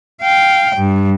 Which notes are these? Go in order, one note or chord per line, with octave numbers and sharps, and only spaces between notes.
F5 G5
G2